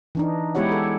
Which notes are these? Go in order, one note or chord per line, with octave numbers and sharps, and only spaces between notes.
E3 D4 D#4
G#3 B3 E4 G4 C#5 F#5
A4